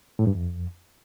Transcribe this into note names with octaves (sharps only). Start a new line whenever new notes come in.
A2
G2
F2